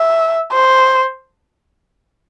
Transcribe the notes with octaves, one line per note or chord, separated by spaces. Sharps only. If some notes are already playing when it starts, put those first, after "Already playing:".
Already playing: E5
C5